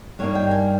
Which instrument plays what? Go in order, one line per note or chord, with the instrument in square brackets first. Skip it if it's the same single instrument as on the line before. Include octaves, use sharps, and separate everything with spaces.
[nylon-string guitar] G2 G3 A#3 D#4 C#5
G5
G#5